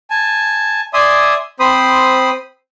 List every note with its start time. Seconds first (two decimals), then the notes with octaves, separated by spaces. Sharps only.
0.10 G#5 A5
0.93 D5 E5 G#5 C6 D#6
1.60 C4 C5 B5 D#6